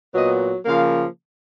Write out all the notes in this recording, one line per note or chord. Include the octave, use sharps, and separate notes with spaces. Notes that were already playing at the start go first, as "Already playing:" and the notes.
A#2 F#3 B3 D#5
C#3 F3 A#3 F5